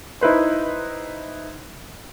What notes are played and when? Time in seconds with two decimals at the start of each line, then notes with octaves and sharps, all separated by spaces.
0.21 D#4 E4 B4 C5